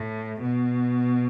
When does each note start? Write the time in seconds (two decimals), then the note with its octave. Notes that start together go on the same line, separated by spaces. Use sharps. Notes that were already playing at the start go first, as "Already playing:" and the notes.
Already playing: A2
0.42 B2